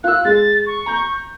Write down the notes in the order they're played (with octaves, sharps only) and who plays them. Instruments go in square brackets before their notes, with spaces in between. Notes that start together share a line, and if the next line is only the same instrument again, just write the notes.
[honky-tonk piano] F4 E6 [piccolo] F#6
[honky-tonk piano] G#3 [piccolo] A6
[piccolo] C#6
[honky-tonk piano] A#5 G6